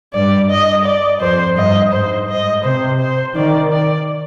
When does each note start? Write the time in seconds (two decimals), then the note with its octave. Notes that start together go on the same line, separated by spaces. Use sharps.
0.13 G2 D5
0.50 D#5
0.85 D5
1.21 F2 C5
1.56 G2 D#5
1.93 G#2 C5
2.28 D#5
2.64 C3 C5
3.00 C5
3.35 D#3 D5
3.71 D5